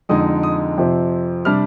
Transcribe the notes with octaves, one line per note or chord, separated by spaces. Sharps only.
F2 D3 G#3 D#4 D#6
D#6
F2 C3 F3 C4
C3 G3 D4 F6